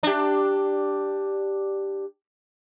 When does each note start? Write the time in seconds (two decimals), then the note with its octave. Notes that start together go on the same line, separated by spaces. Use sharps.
0.03 D4 G4